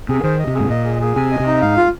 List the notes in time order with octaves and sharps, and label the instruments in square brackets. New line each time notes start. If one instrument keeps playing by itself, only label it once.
[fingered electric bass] C3 [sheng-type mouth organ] G#4
[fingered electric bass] D#3 [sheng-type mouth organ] C5
[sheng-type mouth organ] D#5
[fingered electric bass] C3
[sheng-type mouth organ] G#4
[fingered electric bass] G#2
[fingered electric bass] A#2 [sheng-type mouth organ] D#5
[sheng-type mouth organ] G#4
G#4
[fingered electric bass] C3 [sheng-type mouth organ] G#5
[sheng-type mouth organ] D#5
[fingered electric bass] C3
[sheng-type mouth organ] D#4
[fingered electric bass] G#2 [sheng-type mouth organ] F5
[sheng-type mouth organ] F4